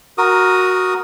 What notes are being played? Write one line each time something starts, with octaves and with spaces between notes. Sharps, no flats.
F#4 A#4 D#6